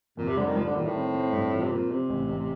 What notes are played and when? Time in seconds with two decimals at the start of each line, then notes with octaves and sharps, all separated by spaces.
0.17 F2 A#2
0.28 C3
0.37 D3 G3
0.46 D#3
0.56 F3 G3
0.65 D3
0.75 A#2 D#3
0.85 A2
0.95 C4
1.14 C4
1.33 G2
1.52 F3
1.62 C3
1.71 A#2 C4
1.91 C3 C4
2.10 A1
2.29 A1